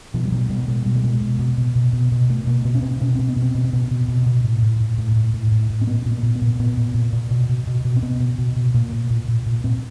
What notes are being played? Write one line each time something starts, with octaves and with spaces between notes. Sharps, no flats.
B2 F3
G3
B2 F#3
B2 G3
B2 G#3
B2 G3
G#3
B2
B2
B2
B2
B2
B2
B2
B2 A3
B2 A#3
B2 B3
C#4
B2 C4
B2 C#4
B2 C4
B3
B2
C4
B2
C4
B2 B3
B2
B2
B2
A2
A2
A2
A2
A2
A2
A2
A2
C4
A#2 B3
A#2
B3
A#2
B3
A#2
A#2 B3
A#2
A#2
A#2
B2
B2
B2
B2
C4
B2 B3
B2
B2
B2
A#2 A#3
A#2
A#2
A#2
A#2
A#2 C4